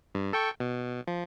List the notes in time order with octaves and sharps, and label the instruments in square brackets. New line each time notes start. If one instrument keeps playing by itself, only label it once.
[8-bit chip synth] G2
A4 G5 C#6
B2
F3